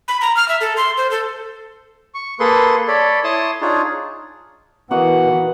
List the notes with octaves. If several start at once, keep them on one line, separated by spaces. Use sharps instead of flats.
B5
A#5
F6
E5
A4
C6
C5
A4
C#6
A#3 G#4 A4 B4 C6
A4 C#5 D5 B5
E4 C#5 A5 C6 D#6
D4 D#4 F4 G#4 C#5
B2 E3 A#3 F#4 D#5 F#5